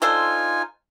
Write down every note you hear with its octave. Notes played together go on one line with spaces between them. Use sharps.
D4 D#4 F4 A4 C5 G#5